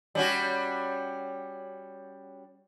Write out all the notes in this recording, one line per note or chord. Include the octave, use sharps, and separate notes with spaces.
G3 C#4 F#4